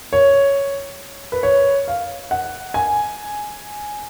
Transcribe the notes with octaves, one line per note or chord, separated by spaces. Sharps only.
C#5
B4
C#5
F5
F#5
G#5